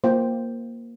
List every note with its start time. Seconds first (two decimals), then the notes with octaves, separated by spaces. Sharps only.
0.04 A#3 F4 C5 G5